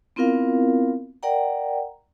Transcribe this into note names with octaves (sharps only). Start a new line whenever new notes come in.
B3 C4 E4 F4 A#4 F5
A#4 D5 F#5 G5 A#5